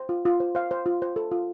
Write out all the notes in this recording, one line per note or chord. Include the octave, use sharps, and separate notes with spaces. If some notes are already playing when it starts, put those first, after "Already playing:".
Already playing: C5
F4
F4
C5
C5 F5
C5
F4
C5
A4
F4